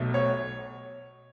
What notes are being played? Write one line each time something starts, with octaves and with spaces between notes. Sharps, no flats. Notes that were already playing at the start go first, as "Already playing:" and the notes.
Already playing: B1 B2 A3
C#5